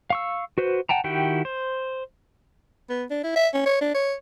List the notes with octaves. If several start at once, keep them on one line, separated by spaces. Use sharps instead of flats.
F5 C#6 E6
F#4 B4 C5
F#5 G5 A5 A#5
D#3 E4 F#4 G4 G5
C5
B3
D4
E4
E5
C#4
C#5
D4
C#5